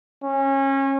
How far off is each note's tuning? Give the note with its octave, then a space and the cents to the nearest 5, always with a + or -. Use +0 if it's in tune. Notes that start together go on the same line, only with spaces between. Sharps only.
C#4 -25